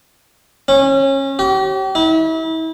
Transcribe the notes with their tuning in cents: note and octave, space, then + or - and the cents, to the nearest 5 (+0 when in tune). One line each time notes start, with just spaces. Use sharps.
C#4 -25
G4 -40
E4 -35